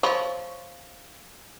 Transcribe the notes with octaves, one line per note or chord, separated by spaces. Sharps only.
F3 C#5 B5